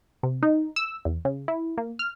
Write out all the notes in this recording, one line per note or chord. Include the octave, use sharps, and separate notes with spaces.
C3
D#4
E6
E2
C#3
E4
A#3
F6